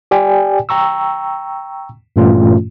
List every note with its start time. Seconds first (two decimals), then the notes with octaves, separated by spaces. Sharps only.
0.11 G4 D5 G5 G#5
0.69 G5 A#5 C#6 E6
2.16 G2 A#2 E3 A3 C#4 F4